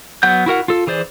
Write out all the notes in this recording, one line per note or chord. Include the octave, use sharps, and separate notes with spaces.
F#3 B3 F#5 G6
E4 F#4 A#4 F#5
F4 A4
E3 G#4 C5 D5